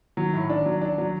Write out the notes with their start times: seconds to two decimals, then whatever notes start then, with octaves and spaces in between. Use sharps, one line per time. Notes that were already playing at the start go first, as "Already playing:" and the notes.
0.17 D#3 F#3
0.33 A2
0.50 D4
0.66 F#3
0.81 D4
0.98 F#3